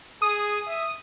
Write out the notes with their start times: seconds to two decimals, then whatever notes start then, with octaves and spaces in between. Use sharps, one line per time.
0.22 G#4 D#6
0.67 E5